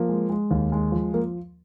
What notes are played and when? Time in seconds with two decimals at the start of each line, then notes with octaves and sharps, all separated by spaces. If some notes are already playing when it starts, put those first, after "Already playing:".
Already playing: F3 A#3
0.09 G#3
0.29 G#3
0.51 D#2
0.72 G#3
0.92 F3
1.13 F3 A#3